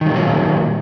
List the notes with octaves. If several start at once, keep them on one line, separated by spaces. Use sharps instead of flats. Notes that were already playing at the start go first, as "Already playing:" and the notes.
A#2 D#3 F#3 G3